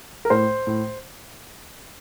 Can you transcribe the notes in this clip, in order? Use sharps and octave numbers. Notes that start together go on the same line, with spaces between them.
A#4
A2 C5
A2